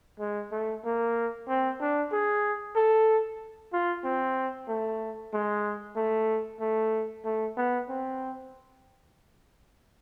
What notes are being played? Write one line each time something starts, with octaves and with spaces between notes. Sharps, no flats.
G#3
A3
A#3
C4
D4
G#4
A4
F4
C4
A3
G#3
A3
A3
A3
B3
C4